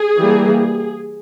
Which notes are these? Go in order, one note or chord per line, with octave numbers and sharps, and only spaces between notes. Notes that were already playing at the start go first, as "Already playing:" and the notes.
Already playing: G#4
E3 G3 A#3